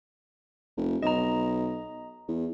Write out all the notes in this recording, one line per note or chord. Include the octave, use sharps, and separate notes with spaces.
F1
B1 D#5 A#5
E2